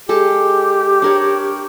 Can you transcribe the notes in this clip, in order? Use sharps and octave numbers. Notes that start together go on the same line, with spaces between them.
G#3 G4 A4
D4 A#4 C#5